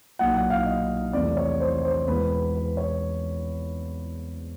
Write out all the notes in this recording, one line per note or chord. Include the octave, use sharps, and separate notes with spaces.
B1 A#2 F#3 F#5
F#5
F5
D#5
E2 C3 F3 A3 D5
C#5
C5
C5
E2 B2 G#3 B4
B4
B4
C#5